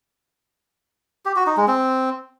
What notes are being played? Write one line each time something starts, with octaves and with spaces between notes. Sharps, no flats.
G4
F#4
D#4
G#3
C4